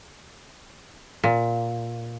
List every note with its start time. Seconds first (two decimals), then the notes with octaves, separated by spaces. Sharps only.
1.24 A#2